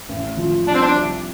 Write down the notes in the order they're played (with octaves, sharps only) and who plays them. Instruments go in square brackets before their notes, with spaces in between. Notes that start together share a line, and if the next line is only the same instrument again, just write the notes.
[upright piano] A1
F3
[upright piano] G3 [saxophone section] D4
[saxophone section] C4
D4
[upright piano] C2